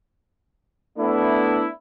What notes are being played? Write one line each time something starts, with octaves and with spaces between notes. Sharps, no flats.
A3 B3 D4 E4